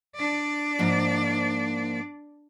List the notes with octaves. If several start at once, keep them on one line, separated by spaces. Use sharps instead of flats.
D4 D5
G#2 F3 A#3